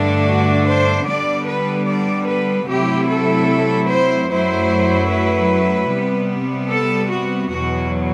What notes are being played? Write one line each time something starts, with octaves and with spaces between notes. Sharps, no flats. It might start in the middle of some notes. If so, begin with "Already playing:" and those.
Already playing: G2 D3 A3 D4
F#4
C5
D3 G3 B3 D4 D5
B4
D5
B4
C3 F#3 A3 E4 G4
A4
C5
F#2 F#3 A3 E4 C5
B4
C3 G3 B3
A4
F#4
E2 B2 F#3 F#4